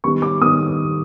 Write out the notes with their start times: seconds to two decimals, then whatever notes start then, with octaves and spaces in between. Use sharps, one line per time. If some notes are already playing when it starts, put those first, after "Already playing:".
0.04 D#3 G3 B3 C#6
0.22 D6
0.41 D#3 G3 B3 D#6